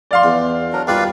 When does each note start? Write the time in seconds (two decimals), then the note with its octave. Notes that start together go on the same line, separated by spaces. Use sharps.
0.11 D5 F5 C6
0.24 E2
0.73 F#3 D4 A#4
0.87 D#2 G3 F4 B4 D5 F5